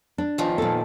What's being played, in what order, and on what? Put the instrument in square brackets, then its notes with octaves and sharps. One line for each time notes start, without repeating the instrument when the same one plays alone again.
[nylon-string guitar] D4
[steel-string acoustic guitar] E2 D#3 F3
[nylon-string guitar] A#2 A4